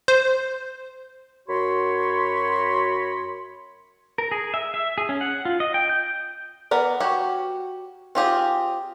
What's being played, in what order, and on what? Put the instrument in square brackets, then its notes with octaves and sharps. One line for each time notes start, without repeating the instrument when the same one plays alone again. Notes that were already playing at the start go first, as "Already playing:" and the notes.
[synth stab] C5
[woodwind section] F#2 F#4 C#5 B5 C6
[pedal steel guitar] A#4
G#4
E5
E5
G#4
C#4
F#5
F4
D#5
G5
G6
[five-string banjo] B3 A#4 D5
F#4 G4 C#5
C4 F4 G4 G#4